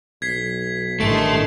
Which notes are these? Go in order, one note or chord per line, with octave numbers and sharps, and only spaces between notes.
B1 G#6 B6 C7
A1 G2 D#3 A3 A4 C6 C#6 D7